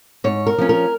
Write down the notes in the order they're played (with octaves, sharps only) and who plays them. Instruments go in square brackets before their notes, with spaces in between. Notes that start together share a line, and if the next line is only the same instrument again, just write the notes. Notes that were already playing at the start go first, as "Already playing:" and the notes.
[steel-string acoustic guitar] G#2 C#5
A#4
F3 C#4
A#4